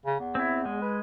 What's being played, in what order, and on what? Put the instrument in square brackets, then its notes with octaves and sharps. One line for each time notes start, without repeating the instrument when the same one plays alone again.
[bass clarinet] C#3
E2
[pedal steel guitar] C4 E4
G#3
[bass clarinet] B4